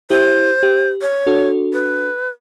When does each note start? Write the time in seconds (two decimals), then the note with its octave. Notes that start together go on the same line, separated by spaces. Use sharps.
0.10 E4 G4 C5
0.63 G4
1.01 C#5
1.27 D4 F#4 A4
1.73 B4